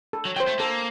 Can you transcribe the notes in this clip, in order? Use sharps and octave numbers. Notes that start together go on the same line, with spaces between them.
A4
F#3
F#3 C5 G5
A3
A#3 A4